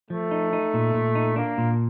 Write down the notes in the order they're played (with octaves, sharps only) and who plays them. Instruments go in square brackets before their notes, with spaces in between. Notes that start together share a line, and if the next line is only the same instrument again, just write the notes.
[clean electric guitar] F3 [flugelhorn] A3
[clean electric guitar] D#4
D#4
A#2
A#2
D#4
[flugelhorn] A#3 [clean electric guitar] D4
[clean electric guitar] A#2